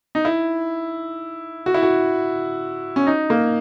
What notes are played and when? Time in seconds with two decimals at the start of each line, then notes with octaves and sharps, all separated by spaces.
0.15 D#4
0.25 E4
1.66 F#4
1.74 E4
1.83 F#4
2.96 C#4
3.07 D#4
3.30 A#3